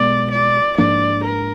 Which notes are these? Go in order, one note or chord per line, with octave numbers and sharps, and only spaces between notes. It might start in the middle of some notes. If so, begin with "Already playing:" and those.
Already playing: B1 B2 G#3 B3 D5
D5
G#2 F3 A#3 D4 D5
A#4